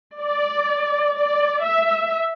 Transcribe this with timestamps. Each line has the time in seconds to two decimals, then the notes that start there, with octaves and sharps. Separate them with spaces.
0.20 D5
1.16 D5
1.64 E5